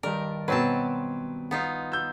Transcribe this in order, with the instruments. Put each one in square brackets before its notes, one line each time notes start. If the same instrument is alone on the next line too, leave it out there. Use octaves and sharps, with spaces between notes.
[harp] G2 D#3 D5 [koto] A#4
[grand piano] B2 B4 [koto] F#3 C4 A5
[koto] B3 D#4 F4
[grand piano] E6 G6